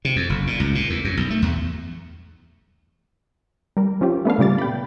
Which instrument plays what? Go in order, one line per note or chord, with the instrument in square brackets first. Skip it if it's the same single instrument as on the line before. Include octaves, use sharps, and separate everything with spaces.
[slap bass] C3
F2
F#1
A#2
C#2
A#2
E2
F#2
B1
A3
E2
[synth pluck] G3 A#4
F3 C#4 F4 G4
A3 B3 D4 F5
A#2 C#3 G3 D6 A6
G5 B5